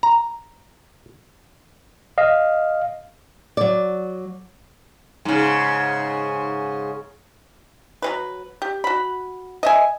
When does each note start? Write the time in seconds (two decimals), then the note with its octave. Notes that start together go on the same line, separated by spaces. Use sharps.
0.03 A#5
2.18 D#5 F5
3.57 F#3 D5
5.25 G#2 C#3
8.02 F#3 G#3 B4
8.62 G4
8.84 F#4 B5
9.63 D#5 E5 G#5